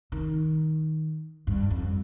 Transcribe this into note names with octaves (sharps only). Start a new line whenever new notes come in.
D#3
G2
F2